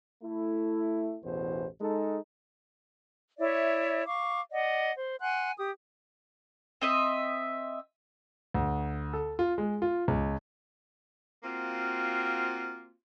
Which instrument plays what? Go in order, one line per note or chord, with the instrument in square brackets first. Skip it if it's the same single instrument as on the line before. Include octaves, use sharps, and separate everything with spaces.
[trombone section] A3 E4
A1 E2 B2 E3 B3 C5
G#3 D#4 A4
[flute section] E4 C#5 D5 E5
F5 C#6 D6
D5 D#5 F#5
C5
F#5 G#5 C6 F#6
G4 D#6
[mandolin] C4 D#5 E5
[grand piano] D2
A4
F4
G#3
F4
C#2
[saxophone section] A#3 C4 F4 F#4